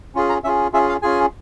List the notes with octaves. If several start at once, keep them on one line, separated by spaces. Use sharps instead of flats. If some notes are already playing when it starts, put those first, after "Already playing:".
C#4 F4 G#4
A#5
C#4 F4 G#4 E5
C#4 F4 G#4 E5
F5
C#4 F4 G#4 G#5